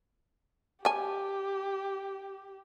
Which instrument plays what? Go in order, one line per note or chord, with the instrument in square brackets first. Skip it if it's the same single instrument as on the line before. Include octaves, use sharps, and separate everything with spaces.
[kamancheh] G4 [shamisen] G#5 A5